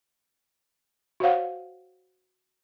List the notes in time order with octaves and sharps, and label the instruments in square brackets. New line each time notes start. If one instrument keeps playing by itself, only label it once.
[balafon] F#4 C5 C#5 F5 F#5